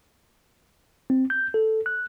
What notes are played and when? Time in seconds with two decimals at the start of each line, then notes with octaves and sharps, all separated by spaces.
1.10 C4
1.30 G6
1.54 A4
1.86 F#6